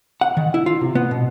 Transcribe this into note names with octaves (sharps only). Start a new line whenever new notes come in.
F#5
D#3
E4
F4
C3
B3
B2